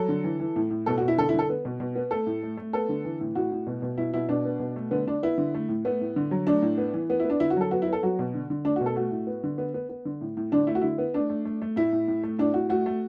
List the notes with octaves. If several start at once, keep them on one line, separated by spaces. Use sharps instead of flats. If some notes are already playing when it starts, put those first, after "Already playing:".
Already playing: F#3 A4
D3
E3
E3
A2
A2
B2 A4
F#4
B2
E4
D3 A4
E4
D3 A4
B3
B2
B2
B3
A3 A4
A2
A3
A3
B3 A4
D3
E3
A2
A2 F#4
A2
B2
B2
B2 E4
B2 E4
B2 D4
B3
B2
A3
D3 B3
D3 D4
B3 E4
D3
A3
A2
A3 B3
A2
D3
F#3
A3 D4
A2
B3
E3
B3
E4
B3
D4
D3 E4
F#4
F#3 A4
B3 F#4
E4
B3
A4
F#3 F#4
B2
D3
D3
A3 D4
F#4
B2
A4
A3 F#4
A2
B3
D3
B3
B3
B3
D3
A2
A2
D3 D4
A3 E4
F#4
D3 E4
B3
A3 D4
A3
A3
A3
A2 E4
A2
A2
A3
A2 D4
A2 F#4
A3 F#4
A3